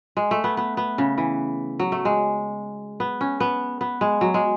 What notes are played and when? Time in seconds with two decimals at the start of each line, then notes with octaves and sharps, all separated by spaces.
0.17 G#3
0.31 A3
0.44 B3
0.57 B3
0.77 B3
0.98 C#3
1.18 E3
1.79 F#3
1.92 A3
2.05 G#3
3.00 B3
3.21 C#4
3.40 B3
3.81 B3
4.01 G#3
4.21 F#3
4.34 G#3